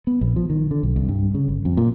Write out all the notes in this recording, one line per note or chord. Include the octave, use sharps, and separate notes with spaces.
B3
A#1
F3
D#3
D3
B1
C2
G2
C#3
G1
F2
A#2